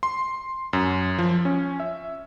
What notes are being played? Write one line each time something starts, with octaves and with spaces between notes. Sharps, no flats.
C6
F#2
F3
C#4
E5